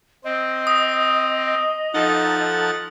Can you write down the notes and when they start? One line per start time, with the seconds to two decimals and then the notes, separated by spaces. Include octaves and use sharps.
0.24 C4 D#5
0.67 D#6
1.94 F3 D#4 A4 F#5 A6